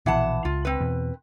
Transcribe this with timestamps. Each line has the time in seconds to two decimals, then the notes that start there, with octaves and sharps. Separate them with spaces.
0.06 A#1 B2 E3 F#5 A5
0.45 C#2 F4
0.65 C4 B4
0.81 E2 B2